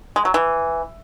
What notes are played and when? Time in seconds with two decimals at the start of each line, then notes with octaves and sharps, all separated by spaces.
0.16 G#3
0.25 F#3
0.34 E3